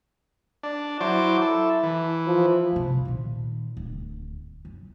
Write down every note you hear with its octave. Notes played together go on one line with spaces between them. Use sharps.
D4
F#3 E4 C5 D6
A4
E3
F3
D2 C3
A#2 D#3
D1
F#2